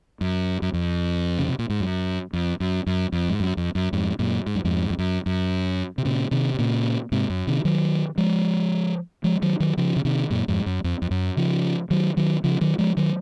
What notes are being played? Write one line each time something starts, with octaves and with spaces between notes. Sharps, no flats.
F#2
F#2
F2
C#3
C3
A#2
G#2
F#2
F2
F#2
F#2
F2
G#2
F#2
F2
F#2
F2 G#2
F#2 A#2
G#2
F#2
F2 G#2
F2
F#2
F#2
C3
A#2 C#3
C3 D#3
C3
A#2 C#3
G#2 C3
F#2
C3 D#3
D#3 F#3
F3 G#3
F3 G#3
D#3 F#3
D#3 F#3
C#3 F3
C#3
C3 D#3
F#2 A#2
F2 G#2
F#2
F2
F2
F#2
C#3 F3
D#3 F#3
D#3 F#3
C#3 F3
D#3 F#3
F3 G#3
D#3 F#3